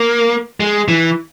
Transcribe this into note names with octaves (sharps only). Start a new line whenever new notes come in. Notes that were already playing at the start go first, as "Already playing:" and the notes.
Already playing: A#3
G#3
E3